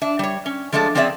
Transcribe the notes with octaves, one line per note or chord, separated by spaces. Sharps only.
D4 E5
G3 C#5
C#4
F3 G#3 A3 D4 A4
F3 C4 C#4 G#4 D5 E5